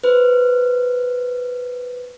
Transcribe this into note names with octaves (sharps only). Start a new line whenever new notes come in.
B4 C5